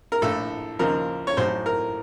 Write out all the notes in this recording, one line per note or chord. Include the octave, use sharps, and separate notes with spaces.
A#4
A#1 A2 A3 A4
D#2 C#3 F3 A#4
C#5
A1 A2 F#3 C5
A#4